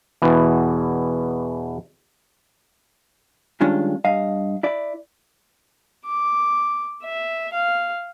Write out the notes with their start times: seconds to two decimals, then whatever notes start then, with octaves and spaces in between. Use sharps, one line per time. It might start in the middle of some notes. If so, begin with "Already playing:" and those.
0.22 E2 B2 E3
3.61 G2 D#3 G#3 C#4 D4 F4
4.05 G2 D#5 F5
4.63 E4 D5
6.05 D6
7.03 E5
7.53 F5